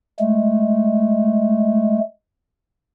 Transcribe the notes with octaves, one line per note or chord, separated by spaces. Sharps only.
G#3 A3